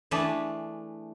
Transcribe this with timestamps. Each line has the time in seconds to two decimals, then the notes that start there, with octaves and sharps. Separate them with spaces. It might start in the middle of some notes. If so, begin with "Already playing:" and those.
0.11 E3 A3 D4 G#4 B4